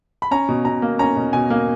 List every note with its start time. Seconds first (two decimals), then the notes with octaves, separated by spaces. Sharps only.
0.22 B5
0.31 C#4 A#5
0.49 B2
0.65 B2 A#5
0.82 A#3
0.99 C#4 A#5
1.16 B2
1.33 B2 G#5
1.50 A#3